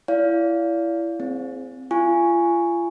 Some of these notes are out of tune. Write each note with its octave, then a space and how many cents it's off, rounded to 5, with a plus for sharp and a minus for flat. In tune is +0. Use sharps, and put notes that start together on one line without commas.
E4 +20 D5 -35 F5 +0
C4 +0 G#4 +0
F4 -35 G#5 +0 C#6 +0